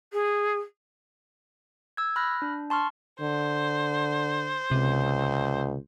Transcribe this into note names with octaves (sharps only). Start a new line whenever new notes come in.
G#4
E6 G#6
B5 F6 F#6 A#6
D4
A5 C6 C#6 F6
D3 C5
C#2 C3